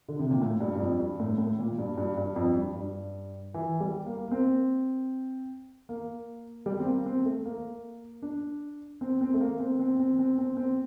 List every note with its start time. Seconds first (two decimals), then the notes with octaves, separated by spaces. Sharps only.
0.09 D3
0.19 C3
0.31 A#2
0.42 A2
0.61 G2
0.75 G2
0.80 F2
1.00 G2
1.20 A2
1.38 A2
1.59 A#2
1.78 G2
1.98 G2
2.18 G2
2.36 F2
2.56 G2
2.76 G2
3.54 E3
3.80 G3
4.06 A#3
4.28 A#3
4.31 C4
5.89 A#3
6.66 G3
6.80 C4
6.86 A#3
7.06 C4
7.25 A3
7.45 A#3
8.22 D4
9.01 C4
9.21 C4
9.34 A3
9.41 A#3
9.60 C4
9.79 C4
9.99 C4
10.19 C4
10.38 C4
10.57 C4